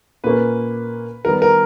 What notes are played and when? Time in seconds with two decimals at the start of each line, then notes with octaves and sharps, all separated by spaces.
0.24 A#2 A#3 C#4 B4
1.25 D#3 G3 B3 A#4
1.42 A#4